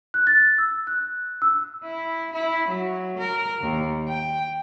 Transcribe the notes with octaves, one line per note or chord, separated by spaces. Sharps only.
F#6
A6
E6
F#6
E6
E4
E4
F#3
A#4
D#2
G5